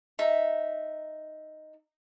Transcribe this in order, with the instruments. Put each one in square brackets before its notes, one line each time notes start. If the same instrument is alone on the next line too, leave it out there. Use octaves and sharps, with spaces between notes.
[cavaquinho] D#4 E5